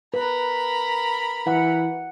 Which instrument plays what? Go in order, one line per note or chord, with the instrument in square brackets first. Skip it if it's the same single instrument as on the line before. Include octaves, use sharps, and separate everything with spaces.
[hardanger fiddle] A#4 B5 [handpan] B4
[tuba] E3 [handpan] F#5